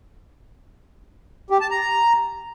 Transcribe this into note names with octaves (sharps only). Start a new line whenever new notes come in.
G4
A5
A#5